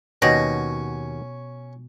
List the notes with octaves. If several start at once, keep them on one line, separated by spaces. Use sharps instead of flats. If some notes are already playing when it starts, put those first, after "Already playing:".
D#2 B2 C#4 F#4 G5 A#6